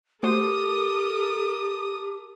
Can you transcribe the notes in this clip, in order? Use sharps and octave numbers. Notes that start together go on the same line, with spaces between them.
A3 F#4 G4 A4 A#4 C5 D#6